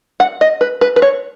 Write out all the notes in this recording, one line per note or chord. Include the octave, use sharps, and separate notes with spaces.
F#5
D#5
B4
B4
B4
C#5